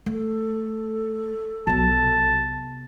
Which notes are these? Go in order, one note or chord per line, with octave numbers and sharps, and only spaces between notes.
A3 A4
B1 C3 F#3 B3 A5